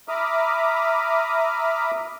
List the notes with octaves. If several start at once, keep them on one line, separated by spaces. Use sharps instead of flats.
E5 A#5 B5 D6 D#6 F6